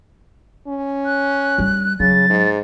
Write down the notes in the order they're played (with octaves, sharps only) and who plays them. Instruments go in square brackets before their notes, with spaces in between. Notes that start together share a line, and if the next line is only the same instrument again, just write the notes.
[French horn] C#4
[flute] F#6
[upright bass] G3
[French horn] C#3 [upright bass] F#3 [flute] A6
[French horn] G#2